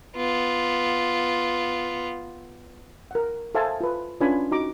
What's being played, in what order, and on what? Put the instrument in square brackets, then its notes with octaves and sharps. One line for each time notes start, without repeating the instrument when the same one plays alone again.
[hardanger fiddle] B3 F4
[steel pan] A#4 F#5
A4 C5 E5 F5 G#5 A5
F4 B4
C#4 D4 F4 B4 G#5 B5
D#4 F#4 A#5 D6